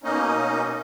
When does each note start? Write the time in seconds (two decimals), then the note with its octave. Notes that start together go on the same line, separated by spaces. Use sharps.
0.03 B2 A#3 C#4 D#4 D#5
0.37 B2 A#3 C#4